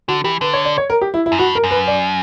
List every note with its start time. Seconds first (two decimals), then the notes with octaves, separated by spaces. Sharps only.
0.08 D3 F#4
0.24 E3 G4
0.41 D3 B4
0.53 C#5
0.65 D5
0.78 C#5
0.90 A#4
1.01 G4
1.14 E4
1.26 E4
1.32 F#2
1.39 G2 F#4
1.55 A#4
1.64 F#2
1.71 B4
1.88 D5